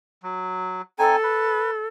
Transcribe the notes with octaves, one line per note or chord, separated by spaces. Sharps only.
F#3
C4 D#4 A4 G#5
B4